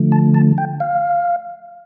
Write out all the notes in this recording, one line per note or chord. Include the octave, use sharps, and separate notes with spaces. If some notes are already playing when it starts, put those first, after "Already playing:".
Already playing: D3 F3 A3
A5
A5
G5
F5